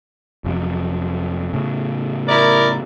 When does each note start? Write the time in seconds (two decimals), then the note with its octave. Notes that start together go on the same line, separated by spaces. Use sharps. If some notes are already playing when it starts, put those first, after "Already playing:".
0.44 F1 F2 F#3
1.53 A2 C#3
2.28 E4 A#4 D5